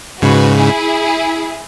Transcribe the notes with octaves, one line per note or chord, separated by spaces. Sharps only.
G#2 C#3 F#4 B4
E4 G#4